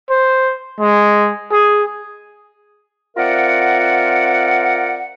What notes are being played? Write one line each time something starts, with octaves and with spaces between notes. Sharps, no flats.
C5
G#3
G#4
C4 F4 A#4 D5 E5 F#5